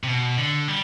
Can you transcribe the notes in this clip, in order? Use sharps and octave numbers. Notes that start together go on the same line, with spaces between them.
C3
B2
D3
G3